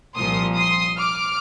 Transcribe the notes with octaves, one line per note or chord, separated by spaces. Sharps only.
C2 A#2 F3 C6 D#6
C6 D#6
D6 F6